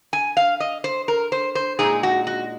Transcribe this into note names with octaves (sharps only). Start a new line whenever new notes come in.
G#5
F5
D#5
C5
A#4
C5
C5
A#2 G#3 D#4 G#4
F#4
F#4